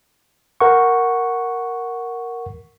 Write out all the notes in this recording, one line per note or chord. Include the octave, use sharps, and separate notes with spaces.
A#4 F#5 C#6